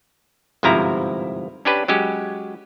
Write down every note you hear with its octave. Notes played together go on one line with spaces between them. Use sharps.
G1 G#2 C3 F3 E4 A#5
C#4 D4 G4 B4
F#3 G#3 C#4 G4